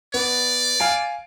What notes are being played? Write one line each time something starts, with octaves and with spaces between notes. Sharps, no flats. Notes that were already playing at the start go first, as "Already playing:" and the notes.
B3 D5
F5 G#5 D7